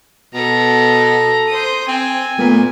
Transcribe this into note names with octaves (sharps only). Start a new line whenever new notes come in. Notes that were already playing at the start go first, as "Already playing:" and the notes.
B2 A4 A#5
C5 D#6
C4 G#5
A#2 A3 B3